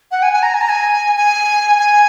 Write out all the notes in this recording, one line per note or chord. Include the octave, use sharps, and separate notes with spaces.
F#5
G#5
G#5
A#5
G#5
A#5
G#5
G#5
G#5